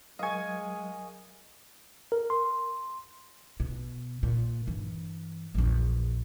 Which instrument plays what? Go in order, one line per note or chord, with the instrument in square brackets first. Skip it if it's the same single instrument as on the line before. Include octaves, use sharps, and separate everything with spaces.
[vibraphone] F#3 A#4 [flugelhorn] G#3 [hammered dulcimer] D#5 G#5 [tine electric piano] F5 C#6
[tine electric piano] A#4
C6
[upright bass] B2
A#2
G2 E3
A#1 E2